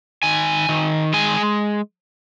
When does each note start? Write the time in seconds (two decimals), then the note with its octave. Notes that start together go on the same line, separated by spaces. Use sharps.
0.23 D#3 G#5
0.69 D#3
1.13 G#3 G#5